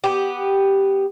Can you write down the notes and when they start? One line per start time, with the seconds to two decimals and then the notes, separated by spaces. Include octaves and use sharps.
0.04 B3 G4